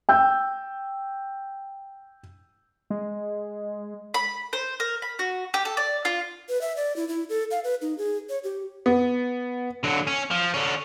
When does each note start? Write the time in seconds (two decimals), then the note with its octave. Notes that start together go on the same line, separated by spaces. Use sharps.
0.09 G5 E6 G6
2.90 G#3
4.14 B5
4.53 C5
4.80 A#4
5.02 B5
5.19 F#4
5.54 G4
5.65 A4
5.77 D5
6.05 F4
6.49 B4
6.61 E5
6.76 D5
6.96 E4
7.08 E4
7.29 A4
7.51 F5
7.64 B4
7.82 D#4
7.98 G#4
8.29 C#5
8.44 G4
8.86 B3
9.83 D3 F#3
10.07 C#4
10.31 F3
10.54 D3 C#4